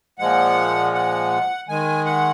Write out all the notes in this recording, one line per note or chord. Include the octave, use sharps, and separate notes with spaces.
A#2 F3 G#3 F#5
F#5
D#3 G#3 G#5
F#5